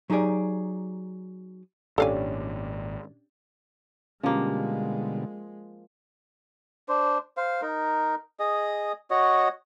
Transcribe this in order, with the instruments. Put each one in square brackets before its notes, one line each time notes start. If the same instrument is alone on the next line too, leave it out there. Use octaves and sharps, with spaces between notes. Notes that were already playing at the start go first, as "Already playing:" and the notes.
[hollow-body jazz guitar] F#3 D#4 G4 G#4 D5
[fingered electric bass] G#1 A#2 [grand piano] C#4 D4 G4 [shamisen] A4 F5 G#5
[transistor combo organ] B2 D3 G3 [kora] F3 A#3 [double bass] G#3 [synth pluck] C#4 G4
[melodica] D4 C5
C5 F5
D#4 A#4
G#4 D#5
F#4 C#5 D#5